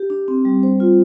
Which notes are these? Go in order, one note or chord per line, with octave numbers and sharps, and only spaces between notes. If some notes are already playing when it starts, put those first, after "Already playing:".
Already playing: G4
D4
C4
G3
C5
F4